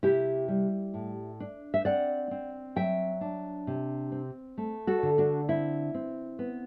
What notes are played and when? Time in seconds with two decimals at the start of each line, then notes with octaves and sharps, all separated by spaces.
0.03 C3 E4 G4
0.48 G3
0.94 A2
1.40 D4
1.74 E5
1.85 C4 D5 F#5
2.31 C4
2.76 F#3 E5 G5
3.21 D4
3.67 C3
4.12 C4
4.58 A3
4.87 F#4 A4
5.03 D3
5.18 D4 F#4
5.48 C4 E4
5.94 C4
6.39 B3